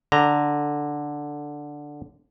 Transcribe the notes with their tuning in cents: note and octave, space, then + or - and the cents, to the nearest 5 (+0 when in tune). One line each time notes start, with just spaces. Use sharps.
D3 +0 A#5 -5